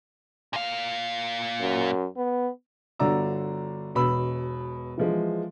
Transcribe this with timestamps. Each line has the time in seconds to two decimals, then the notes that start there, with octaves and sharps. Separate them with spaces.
0.53 A#2 F5
1.60 F#2
2.17 B3
2.99 G1 D3 F#4 D5 A#5 E6
3.95 E1 B2 B5 E6
4.98 E3 F3 G#3